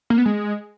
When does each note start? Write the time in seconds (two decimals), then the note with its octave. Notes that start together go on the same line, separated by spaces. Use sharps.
0.10 A#3
0.18 B3
0.26 G#3